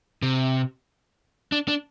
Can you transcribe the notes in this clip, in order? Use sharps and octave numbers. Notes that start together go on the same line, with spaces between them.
C3
D4
D4